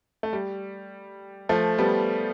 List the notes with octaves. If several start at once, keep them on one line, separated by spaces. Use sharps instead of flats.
A3
G3
F3 A3
G3 B3